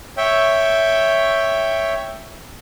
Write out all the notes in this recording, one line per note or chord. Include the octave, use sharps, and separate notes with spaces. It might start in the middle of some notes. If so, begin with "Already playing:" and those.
C#5 E5 G5